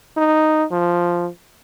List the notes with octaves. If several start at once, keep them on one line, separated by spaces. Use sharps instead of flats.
D#4
F3